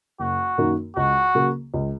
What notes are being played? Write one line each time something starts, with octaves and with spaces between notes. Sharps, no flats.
F#1 F#4
F#2 D#3 A#3 D#4
C#2 F#4
C#3 F#3 A#3
C#2